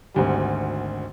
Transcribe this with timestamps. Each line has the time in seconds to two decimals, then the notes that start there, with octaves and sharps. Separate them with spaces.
0.14 G#1 D2 G3